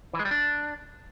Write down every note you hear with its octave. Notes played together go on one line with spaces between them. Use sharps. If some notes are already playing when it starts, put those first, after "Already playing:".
E3
G#3
G3
D4